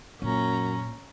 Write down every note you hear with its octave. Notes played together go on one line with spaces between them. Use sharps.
F#2 A#2 C#4 A#5